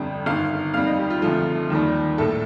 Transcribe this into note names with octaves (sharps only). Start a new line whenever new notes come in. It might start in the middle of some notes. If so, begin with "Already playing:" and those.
Already playing: G1 F2 D3 G3 G5
G1 G2 D#3 F5
F2 D#3 G3 F5
D#5
G4
F4
D2 C3 F3 A3 F4
D#2 D#3 G3
A#1 A2 A3 A4